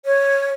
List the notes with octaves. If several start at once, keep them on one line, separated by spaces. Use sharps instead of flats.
C#5